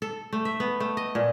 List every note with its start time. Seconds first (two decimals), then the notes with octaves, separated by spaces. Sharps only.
0.02 A4
0.33 A3
0.45 E5
0.60 B3
0.80 A3
0.97 D#5
1.15 A#2